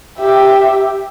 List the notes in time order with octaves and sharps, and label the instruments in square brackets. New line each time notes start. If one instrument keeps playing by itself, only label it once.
[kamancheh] G4 E5